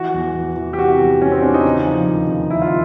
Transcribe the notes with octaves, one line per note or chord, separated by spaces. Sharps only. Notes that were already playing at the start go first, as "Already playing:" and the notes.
Already playing: E3 F#4
E2
E3
E3
G4
C3 F#4
E2
E2 C#4
C4
E3 D4
D#4
C#3
F3
D#2
C#3
D#2 E4
F4